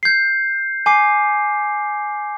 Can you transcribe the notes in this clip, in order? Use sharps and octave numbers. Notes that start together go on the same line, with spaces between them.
G6 C7
G#5 D6 C7